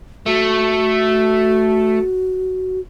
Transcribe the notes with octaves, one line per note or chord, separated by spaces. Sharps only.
A3 F#4